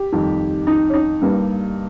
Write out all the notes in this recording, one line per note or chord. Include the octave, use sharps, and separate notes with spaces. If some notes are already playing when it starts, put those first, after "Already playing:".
Already playing: G4
F2 D#3 G3
D#4
C#4
D#4
G2 G3 A#3